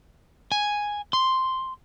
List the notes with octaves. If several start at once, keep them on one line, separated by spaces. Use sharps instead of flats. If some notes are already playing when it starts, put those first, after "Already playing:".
G#5
C6